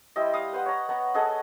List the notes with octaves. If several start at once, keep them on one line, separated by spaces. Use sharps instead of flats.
G3 E4 C5 D#5
F5 D#6
B4 C5 F#5
C#5 A#5
B3 A#5
G#4 A4 D#5 F#5